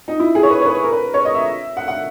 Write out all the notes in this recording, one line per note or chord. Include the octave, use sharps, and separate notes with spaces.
D#4
E4
G#4
C#5
B4
C#5
B4
A#4
B4
C#5
D#5
E5
F#5
F#5